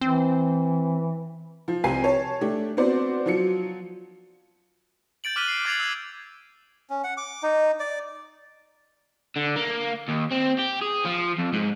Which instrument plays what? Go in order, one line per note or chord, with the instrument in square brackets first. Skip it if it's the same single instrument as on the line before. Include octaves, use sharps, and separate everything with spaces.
[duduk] E3 [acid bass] C4
[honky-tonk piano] F3
C2 C4 G4 G5 G#5 C7
C#5 A5
A3 D4 G4
B3 C4 F#4 C5 D5
F3 F#3 C#7
[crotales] G6 A6 D7 F#7
D6 F6 F#6 B6 D#7 G7
C7
D6 G#6 A6 C7 F7 F#7
E6 G#6
[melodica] C#4
F#5
D6
D#4
D5
[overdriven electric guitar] D3
A#3
D#2
C4
G4
G#4
F3
F2
G#2